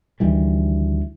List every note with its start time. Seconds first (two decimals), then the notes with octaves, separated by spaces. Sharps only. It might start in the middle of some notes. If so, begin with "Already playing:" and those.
0.20 D2 D#3 E3 G3